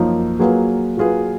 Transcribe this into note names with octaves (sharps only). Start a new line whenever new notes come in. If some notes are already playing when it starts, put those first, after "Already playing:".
Already playing: F#2 F3 A#3 D#4
F#3 A#3 F4 G#4 B4
F#3 A#3 F4 G#4 B4